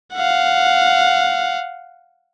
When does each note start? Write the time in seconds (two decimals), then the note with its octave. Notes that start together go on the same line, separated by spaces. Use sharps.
0.14 F5 F#5